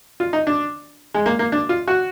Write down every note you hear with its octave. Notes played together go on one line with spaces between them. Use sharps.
F4
D#4
D4
G#3
A#3
A#3
D4
F4
F#4